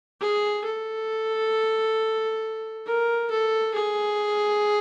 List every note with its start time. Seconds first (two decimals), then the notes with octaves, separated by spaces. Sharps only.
0.21 G#4
0.65 A4
2.86 A#4
3.30 A4
3.74 G#4